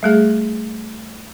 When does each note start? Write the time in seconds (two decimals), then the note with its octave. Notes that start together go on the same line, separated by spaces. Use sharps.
0.03 G3 A3 G#4